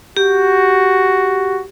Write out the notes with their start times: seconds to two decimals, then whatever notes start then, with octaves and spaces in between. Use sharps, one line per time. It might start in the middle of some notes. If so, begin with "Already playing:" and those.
0.17 F#4 G4